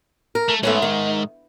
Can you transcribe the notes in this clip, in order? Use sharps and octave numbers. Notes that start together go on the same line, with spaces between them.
A#4
A3
G#2 A3 B3 C#4
D#3